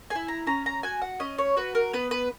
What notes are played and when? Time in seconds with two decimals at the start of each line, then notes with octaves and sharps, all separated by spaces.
0.10 G#4 G#5
0.15 E4
0.28 A#5
0.47 C#4 A#5
0.66 A#5
0.83 F#4 G#5
1.02 F#5
1.20 C#4 D#5
1.38 C#5
1.57 F#4 B4
1.75 A#4
1.93 B3 B4
2.11 B4